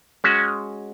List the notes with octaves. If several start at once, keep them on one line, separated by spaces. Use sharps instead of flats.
G#3 C#4 F#4